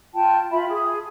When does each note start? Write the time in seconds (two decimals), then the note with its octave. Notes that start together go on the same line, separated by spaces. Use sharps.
0.14 F4 G5 A5
0.51 F4 E5 B5
0.68 G#4